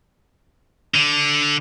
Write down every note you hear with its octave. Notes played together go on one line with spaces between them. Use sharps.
D3